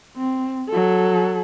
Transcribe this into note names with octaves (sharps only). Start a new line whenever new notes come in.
C4
F#3 A4